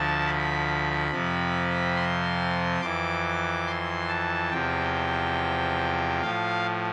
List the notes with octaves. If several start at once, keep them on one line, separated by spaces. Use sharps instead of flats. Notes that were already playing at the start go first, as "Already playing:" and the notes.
Already playing: D2 D3 F3 A5
B5
F2 C3 F3
C6
F2 E3 D6
C6
A5
E2 C3 F3 G5
A2 F3 F5